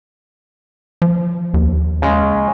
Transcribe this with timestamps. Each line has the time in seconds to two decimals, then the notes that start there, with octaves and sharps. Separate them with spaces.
1.02 F3
1.54 D#2
2.02 C#3 G#3